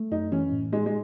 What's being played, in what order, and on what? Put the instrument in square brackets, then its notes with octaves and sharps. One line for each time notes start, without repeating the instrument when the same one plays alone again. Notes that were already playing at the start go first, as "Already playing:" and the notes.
Already playing: [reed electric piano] A3
[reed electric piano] F#2 [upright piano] D#4
[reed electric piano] E3 [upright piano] C#4
[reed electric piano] A2
[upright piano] G#3 [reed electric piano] D#4
[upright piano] G#3